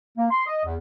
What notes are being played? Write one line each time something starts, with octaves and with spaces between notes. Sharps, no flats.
A#3
C6
D#5
E2